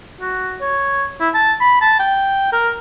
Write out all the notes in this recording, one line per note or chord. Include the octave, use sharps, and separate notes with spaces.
F#4
C#5
E4
A5
B5
A5
G5
A#4